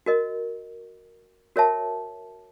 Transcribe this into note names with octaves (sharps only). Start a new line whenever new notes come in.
F#4 A#4 D#5
F#4 A#4 C#5 E5 A5